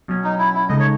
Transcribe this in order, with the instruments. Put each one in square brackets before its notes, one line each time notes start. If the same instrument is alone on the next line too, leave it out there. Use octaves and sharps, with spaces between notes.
[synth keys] B2 F#3 C#4
[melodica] D#4
E4
E4
[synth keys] C#3 G#3 D#4 A4 [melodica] D#5
[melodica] C#5